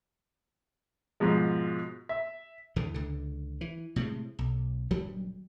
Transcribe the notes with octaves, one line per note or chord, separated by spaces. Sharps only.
G#2 B2 F3 G#3
E5
D#2 D3 E3
C#2 D3
E3
A2 C3 G#3
B1
D#1 G2 F#3 G3